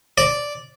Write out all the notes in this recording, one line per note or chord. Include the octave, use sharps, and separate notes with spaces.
D5